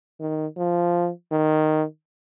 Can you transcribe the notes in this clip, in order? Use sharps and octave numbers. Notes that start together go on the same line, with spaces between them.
D#3
F3
D#3